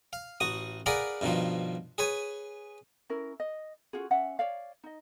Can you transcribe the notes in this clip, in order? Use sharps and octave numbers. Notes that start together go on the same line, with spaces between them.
F5
A1 F#4 D#6
G#4 A#4 B4 D5 F5 F#5
G2 B2 D#3 F3
G#4 B4 C#5 G#5
C#4 E4 A#4
D#5
C#4 F4 F#4 G#4
C#4 E5 F#5
C#5 D5 F5
D#4 D#5